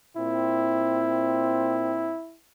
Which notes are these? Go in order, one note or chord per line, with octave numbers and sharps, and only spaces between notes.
A#2 C4 E4